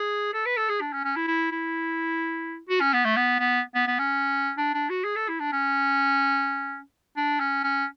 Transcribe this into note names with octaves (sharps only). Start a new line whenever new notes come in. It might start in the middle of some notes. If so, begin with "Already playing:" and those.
Already playing: G#4
A4
B4
A4
G#4
D4
C#4
C#4
E4
E4
E4
F#4
C#4
B3
A3
B3
B3
B3
B3
C#4
D4
D4
F#4
G#4
A4
E4
D4
C#4
D4
C#4
C#4